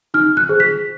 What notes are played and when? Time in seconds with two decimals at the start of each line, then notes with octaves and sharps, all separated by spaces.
0.14 D#4 F6
0.37 F#6
0.49 G#4 C5
0.60 B6